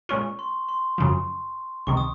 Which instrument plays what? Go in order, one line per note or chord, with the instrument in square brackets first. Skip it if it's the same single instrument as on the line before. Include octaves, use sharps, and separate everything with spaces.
[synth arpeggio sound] A#2 G#3 C#4 F4 [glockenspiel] C#6
[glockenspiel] C6
C6
[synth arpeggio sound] F#2 C#3 F3
[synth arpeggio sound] C#2 C3 D#3 [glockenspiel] C#6
[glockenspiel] D#6